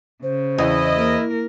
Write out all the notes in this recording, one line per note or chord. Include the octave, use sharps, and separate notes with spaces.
C#3 C5
E2 E4 D#5
A#3 A#4